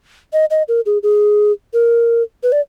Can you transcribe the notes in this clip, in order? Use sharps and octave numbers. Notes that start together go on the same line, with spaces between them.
D#5
D#5
A#4
G#4
G#4
A#4
B4
D5